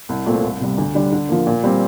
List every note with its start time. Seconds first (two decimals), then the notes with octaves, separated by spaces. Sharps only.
0.09 C2
0.26 A#2 A3 C4
0.43 C2
0.61 C3 G3
0.78 D2
0.95 D3 G3 D4
1.12 D3
1.29 F3 A#3
1.47 A#2
1.64 G3 C4